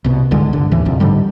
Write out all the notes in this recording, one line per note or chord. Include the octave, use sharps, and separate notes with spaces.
C2 B2
G#1 C#2 D3 G#3
G1 D3
F1 D#2 A2 E3
G1 C2 F2
G#2 D3 G3